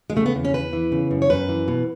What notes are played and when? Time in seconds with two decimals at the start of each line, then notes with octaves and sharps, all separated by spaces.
0.10 G#3
0.16 C#3 A3
0.26 B3
0.35 E2
0.45 C#4
0.54 E2 B4
0.73 E3
0.92 C#3
1.11 F#2
1.22 C#5
1.30 F#2 B4
1.49 E3
1.68 B2